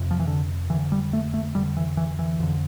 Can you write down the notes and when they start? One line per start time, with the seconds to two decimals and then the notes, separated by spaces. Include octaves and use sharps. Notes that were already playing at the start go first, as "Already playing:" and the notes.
Already playing: F2 C3
0.11 F3
0.20 E3
0.27 D3
0.70 F2 D3 E3
0.92 G3
1.13 A3
1.34 A3
1.55 F2 D3 G3
1.77 E3
1.97 E3
2.19 E3
2.40 F2 D3